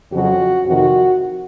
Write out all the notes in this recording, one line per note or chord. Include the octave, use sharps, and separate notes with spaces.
F2 C#3 F#3 F#4
F2 C3 D#3 F#4